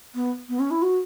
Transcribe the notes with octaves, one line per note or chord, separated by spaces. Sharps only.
B3
B3
C#4
E4
F#4